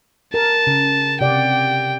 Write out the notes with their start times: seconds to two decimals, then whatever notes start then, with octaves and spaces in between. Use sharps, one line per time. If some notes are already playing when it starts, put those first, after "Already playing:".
0.34 A#4 A5
0.67 C#3
1.21 C3 D5 F#5 G5